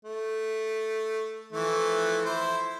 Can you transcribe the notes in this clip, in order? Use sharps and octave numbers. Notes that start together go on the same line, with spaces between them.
A3
E3 F3 A3
E4 C5